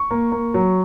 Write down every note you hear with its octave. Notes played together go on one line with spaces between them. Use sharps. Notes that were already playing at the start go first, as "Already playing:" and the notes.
Already playing: C#6
A#3
A#3
F#3